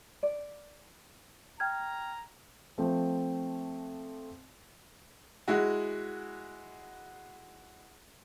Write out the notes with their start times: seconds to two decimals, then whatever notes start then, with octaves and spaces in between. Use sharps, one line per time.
0.23 D5
1.60 G5 A#5 F6 G#6
2.78 F3 A3 C4
5.48 G#3 E4 F#4